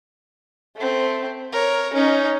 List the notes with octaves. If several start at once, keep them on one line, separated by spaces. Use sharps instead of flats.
A3 C4
A#4 C#5
C#4 D#4